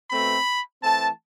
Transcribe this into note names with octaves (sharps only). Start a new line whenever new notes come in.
B2 A3 C4 B5
E3 A3 C4 A5